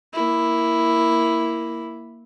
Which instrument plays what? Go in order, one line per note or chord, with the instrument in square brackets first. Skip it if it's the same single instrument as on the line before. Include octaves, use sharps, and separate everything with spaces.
[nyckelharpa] A#3 E4